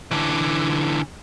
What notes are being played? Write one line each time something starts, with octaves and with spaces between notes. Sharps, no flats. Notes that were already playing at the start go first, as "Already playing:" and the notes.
D3 E3